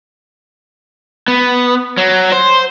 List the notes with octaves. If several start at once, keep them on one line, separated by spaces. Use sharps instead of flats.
B3
F#3
C5